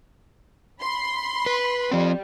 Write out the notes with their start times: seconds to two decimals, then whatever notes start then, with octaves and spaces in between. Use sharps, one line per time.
0.81 B5 C6
1.46 B4
1.91 F3 G3 C4